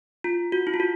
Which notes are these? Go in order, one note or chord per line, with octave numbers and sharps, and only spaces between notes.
F4
F#4
E4
F4
F#4